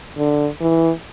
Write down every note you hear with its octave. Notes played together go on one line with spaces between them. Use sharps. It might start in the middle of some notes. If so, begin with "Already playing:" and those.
D3
E3